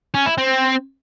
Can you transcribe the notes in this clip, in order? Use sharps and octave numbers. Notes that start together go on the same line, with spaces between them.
C#4
E4
C4